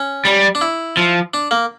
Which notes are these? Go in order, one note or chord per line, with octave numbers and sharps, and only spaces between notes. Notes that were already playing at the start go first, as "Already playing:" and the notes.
Already playing: C#4
G3
D4
E4
F3
D4
A#3